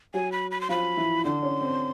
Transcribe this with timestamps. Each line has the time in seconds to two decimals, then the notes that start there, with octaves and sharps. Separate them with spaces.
0.14 F#3 F#4 G#5
0.32 B5
0.51 B5
0.61 C6
0.69 F3 F4 B5
0.97 E3 E4
1.25 D3 D4 C6
1.43 C#4
1.61 C4